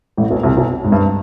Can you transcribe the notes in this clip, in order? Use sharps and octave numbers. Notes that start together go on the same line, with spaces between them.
A1 A2
B1 B2
C2 C3
B1 B2
G#2
G2